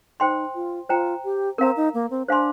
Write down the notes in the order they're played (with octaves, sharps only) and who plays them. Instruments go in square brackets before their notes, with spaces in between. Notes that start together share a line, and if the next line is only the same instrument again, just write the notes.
[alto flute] D#4 [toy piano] C5 G5 C6
[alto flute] F4
[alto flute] F4 [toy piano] C5 G5 A#5
[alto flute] G4
[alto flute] C4 [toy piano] A#4 F5 A#5
[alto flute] D#4
A#3
C4
[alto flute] D4 [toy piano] C5 F5 G#5 C6